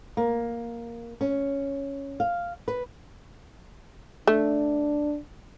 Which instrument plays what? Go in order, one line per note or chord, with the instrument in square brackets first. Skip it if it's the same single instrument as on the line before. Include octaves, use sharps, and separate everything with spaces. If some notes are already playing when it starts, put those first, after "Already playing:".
[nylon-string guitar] A#3
C#4
F5
B4
[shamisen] A3 [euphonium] D4